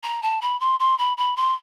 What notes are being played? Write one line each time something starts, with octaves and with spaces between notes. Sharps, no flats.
A#5
A5
B5
C6
C6
B5
B5
C6